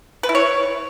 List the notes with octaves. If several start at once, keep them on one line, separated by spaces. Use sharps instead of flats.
B4
E4
C#5